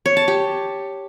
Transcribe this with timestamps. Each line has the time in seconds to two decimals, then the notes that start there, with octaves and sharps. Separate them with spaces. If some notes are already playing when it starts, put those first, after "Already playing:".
0.06 C#5
0.17 A5
0.28 G4